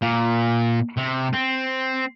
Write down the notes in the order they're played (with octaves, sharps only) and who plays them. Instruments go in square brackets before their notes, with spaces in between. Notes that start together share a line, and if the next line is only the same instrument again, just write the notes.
[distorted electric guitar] A#2
C3
C4